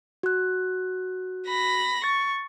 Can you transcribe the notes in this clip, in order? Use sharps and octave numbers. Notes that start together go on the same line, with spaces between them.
F#4 F#6
B5 A#6
C#6 A6